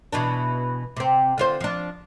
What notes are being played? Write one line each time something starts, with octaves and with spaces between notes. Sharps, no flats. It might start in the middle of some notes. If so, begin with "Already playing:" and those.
B2 E3 D4
C3 C4
D3 F4 C5
F3 D4